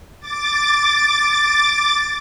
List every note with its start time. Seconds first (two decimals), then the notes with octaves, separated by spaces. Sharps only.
0.20 D6 A6